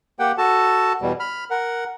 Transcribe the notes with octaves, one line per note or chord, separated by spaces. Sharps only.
A#3 G4 F#5 G5
F#4 A4 A5
E2 B2 G3
B5 F6
A#4 F#5